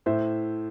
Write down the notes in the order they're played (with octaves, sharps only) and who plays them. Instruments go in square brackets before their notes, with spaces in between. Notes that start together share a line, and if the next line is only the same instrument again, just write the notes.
[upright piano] A2 C5 E5